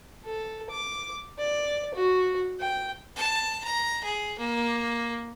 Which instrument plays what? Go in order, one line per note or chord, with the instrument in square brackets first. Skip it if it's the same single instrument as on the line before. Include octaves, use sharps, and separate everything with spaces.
[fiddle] A4
D6
D5
F#4
G5
A5
A#5
G#4
A#3